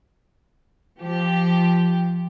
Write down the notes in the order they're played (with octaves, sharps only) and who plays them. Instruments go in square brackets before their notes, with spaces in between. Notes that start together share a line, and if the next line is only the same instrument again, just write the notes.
[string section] F3 G4